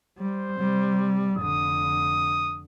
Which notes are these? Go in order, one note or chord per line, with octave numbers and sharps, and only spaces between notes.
G3 C5
C3 G3
F1 D3 D#6